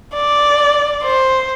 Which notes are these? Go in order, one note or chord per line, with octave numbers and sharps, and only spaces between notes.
D5
C5